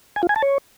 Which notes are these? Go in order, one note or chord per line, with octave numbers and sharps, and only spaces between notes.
G#5
F4
G#5
A5
C#5